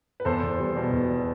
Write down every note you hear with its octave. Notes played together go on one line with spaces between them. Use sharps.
B4
E2 A4 C5
E2
G3
B2
E2